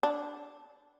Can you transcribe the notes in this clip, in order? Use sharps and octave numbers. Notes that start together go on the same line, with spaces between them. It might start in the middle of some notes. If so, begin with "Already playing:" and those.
D4